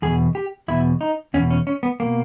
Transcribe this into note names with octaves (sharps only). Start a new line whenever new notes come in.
E2 B2 G#4
G4
E2 B2 E4
D#4
E2 B2 C#4
C#4
C#4
B3
B2 A#3